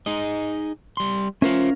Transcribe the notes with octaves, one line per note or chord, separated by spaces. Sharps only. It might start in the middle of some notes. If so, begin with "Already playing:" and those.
D#4 G#4 D#5
G3 C6
C#4 F4 A#4 C5 E5 F5